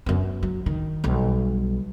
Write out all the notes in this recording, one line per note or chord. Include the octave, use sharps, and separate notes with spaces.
F#2 B3
F#3
D#3
B1 G3